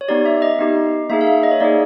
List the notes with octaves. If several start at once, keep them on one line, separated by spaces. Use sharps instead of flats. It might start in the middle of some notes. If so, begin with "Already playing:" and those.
C#5
B3 D#4 G4 D5
E5
D#5
B3 D#4 G4
A#3 D#4 G#4 E5
F5
E5
D#5
C#5
A#3 D#4 G#4 D5